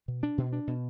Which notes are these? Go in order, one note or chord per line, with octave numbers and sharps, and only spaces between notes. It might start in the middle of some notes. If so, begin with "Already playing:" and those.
B2
D4
B2
D4
B2